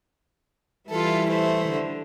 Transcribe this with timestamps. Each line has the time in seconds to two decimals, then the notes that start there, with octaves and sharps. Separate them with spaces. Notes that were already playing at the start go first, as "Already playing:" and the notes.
0.90 E3 G3 E4 F4 A4
1.28 A3 C5
1.69 D3